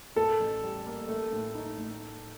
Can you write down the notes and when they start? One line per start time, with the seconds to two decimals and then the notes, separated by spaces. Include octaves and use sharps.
0.16 A2 A4
0.40 A1
0.63 G3
0.86 A#3
1.09 A3
1.33 A2
1.55 D#4
1.78 A2